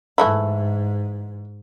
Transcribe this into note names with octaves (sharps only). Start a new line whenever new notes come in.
G#2 E3 A3 E4